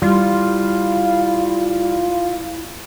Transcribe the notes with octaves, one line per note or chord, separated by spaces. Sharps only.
G3 E4 F4